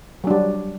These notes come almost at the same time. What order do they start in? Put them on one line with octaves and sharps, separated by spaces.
F#3 D4 G3